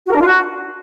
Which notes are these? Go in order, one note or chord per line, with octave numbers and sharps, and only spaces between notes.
F#4
A#4
D4
F4
F#4